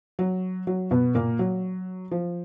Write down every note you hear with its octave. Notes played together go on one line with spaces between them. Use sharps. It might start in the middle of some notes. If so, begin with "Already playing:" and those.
F#3
F#3
B2 B3
A#2 A#3
F#3
F3